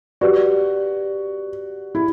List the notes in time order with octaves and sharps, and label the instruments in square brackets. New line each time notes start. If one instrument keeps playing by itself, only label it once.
[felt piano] F#4 [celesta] G4 B4 D5
[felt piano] E4